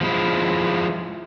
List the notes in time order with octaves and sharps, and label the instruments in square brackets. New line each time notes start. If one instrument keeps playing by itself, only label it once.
[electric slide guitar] F3 G#3 E4